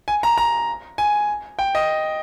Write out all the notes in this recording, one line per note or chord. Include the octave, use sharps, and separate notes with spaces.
G#5
A#5
A#5
G#5
G5
D#5